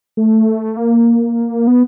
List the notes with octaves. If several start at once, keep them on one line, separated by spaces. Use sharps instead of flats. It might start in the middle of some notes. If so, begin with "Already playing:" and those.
A3
A#3
B3